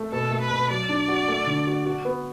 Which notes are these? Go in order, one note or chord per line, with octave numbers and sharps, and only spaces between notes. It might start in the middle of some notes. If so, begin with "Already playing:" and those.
Already playing: A3
B2 A4
A3
B4
B2
F#3 D5
D4
F#4
A3
D3
F#4
F#4
B3